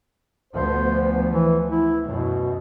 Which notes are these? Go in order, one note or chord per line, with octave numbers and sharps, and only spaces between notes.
D2 F3 B3 C5
E3
E4
F#2 B2